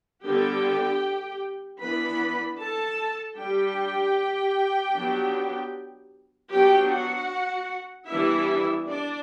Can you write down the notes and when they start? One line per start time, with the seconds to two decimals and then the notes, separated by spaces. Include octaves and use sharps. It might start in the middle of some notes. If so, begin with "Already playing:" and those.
0.23 D3 G3 B3 G4 G5
1.80 E3 B3 D4 B4 B5
2.59 A4 A5
3.37 G3 D4 G4 G5
4.94 F#3 B3 D4
6.51 F#3 B3 D4 G4 G5
6.90 F#4 F#5
8.08 E3 G3 B3 D4 E4 E5
8.86 D4 D5